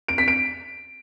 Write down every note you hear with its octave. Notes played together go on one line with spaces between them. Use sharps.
D7
B6
D7